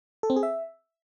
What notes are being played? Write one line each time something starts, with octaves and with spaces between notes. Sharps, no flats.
A4
C4
G#4
E5